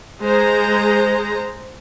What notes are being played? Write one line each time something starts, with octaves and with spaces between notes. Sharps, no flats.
G#3 G#4 C5 A#5